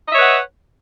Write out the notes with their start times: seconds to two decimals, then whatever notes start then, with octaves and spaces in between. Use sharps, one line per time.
0.08 D#5
0.11 E5
0.15 C#5
0.18 B4
0.21 F#5